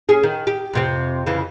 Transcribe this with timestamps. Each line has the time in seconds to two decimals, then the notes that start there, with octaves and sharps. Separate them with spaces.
0.09 C#4 G#4
0.23 D#3
0.47 G4
0.73 F2 C3 C4
1.26 F2 C#3 E3